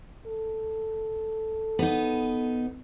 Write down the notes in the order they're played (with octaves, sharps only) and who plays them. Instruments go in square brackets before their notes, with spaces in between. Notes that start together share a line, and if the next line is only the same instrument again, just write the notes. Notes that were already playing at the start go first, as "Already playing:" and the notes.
[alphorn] A4
[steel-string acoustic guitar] B3 D#4